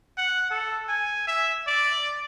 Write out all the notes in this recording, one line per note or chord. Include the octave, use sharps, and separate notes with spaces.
F#5
A4
G#5
E5
D5